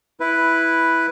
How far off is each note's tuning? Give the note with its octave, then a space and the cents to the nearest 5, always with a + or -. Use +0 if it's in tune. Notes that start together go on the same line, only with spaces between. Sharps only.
E4 +0 B4 +0